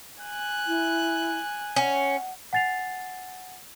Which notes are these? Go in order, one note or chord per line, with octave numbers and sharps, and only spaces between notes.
G#5 F#6
E4
C#4 F#5
F#5 G#5 A6 C7 F7